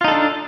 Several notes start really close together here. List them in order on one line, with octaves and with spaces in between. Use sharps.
F4 D#4 A4 D4